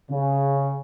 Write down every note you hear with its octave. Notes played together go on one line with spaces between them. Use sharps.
C#3